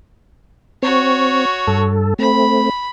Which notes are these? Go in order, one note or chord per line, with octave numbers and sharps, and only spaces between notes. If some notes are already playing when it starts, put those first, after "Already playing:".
C4 F#4 C#5
G2 A4
A3 C4 B5